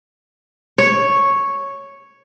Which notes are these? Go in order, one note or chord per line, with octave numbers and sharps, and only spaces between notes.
C#5